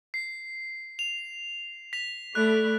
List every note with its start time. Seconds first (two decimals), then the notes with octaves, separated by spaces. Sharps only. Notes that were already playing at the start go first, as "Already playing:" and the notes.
0.14 C7
0.99 F7
1.93 B6 F7
2.35 A3 D5 B5 F#6